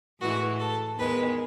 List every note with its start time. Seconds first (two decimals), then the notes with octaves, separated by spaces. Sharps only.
0.21 A2 E3 G#3 F#4
0.59 A4
0.98 E2 D#3 G#3 B4